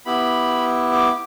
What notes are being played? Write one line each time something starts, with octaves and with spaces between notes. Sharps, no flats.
B3 E4 G4 B5
D6